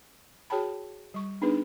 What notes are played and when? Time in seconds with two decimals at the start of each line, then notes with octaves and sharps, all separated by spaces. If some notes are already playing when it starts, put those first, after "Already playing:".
0.50 F#4 G#4 C#5 G5 A5 B5
1.14 G3 C#6
1.41 B3 D4 D#4 G#4 B4